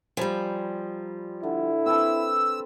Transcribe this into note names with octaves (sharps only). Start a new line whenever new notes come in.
F3 G3 G#5 A#5 B5
D3 E4
C4 B4 A5 E6